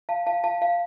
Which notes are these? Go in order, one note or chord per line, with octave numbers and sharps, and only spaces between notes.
F5 A5
F5 A5
F5 A5
F5 A5